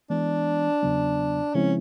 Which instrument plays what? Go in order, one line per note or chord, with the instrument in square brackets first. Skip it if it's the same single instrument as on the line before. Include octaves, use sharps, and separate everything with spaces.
[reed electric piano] E3 G#3 B3 [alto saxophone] D4
[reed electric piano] E2 C#3 F#3 B3
[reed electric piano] C#3 F3 G#3 C4 E4 [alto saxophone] C#4